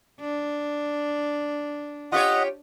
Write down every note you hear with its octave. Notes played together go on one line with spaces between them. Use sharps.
D4
F4 G4 C#5 D#5 F#5